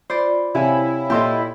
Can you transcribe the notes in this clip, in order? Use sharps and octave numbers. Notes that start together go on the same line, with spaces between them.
F4 C5 D5 B5
C3 E4 C#5 F5 G5 G#5
A#2 G4 A4 D#5 C6